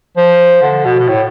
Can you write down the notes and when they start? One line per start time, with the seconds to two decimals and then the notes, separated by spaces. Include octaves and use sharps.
0.17 F3
0.62 D3
0.85 B2
0.99 B2
1.08 A2